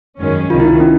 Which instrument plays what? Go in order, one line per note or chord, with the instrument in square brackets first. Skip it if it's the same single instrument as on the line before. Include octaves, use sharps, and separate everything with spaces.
[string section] F#2 D#3 G#3 C#4
[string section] C#2 C3 D#3 [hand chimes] F4
[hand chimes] E4
D#4
C#4